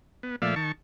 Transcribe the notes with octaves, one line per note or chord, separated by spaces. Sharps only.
B3
A#2 F3 A3 D5 E5 F5
D#3 A5 C#6